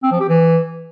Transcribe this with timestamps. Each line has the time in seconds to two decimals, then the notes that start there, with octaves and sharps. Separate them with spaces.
0.03 C4
0.11 F3
0.20 G4
0.29 E3